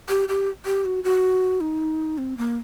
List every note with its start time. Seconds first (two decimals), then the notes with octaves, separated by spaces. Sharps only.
0.09 G4
0.29 G4
0.66 G4
0.85 F#4
1.04 F#4
1.61 D#4
2.18 C4
2.38 A#3